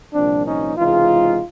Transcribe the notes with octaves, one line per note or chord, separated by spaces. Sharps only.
C2 A#2 F3 C4 D4
C#4 D#4
C#2 C3 E3 G#3 D#4 F4